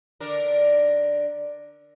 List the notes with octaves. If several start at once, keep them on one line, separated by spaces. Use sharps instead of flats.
D3 D4 A#4